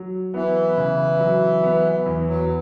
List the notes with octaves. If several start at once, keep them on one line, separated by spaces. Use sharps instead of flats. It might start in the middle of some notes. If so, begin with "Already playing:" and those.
Already playing: F#3
E3 B3
C#3
F#3
B3
E2
F#3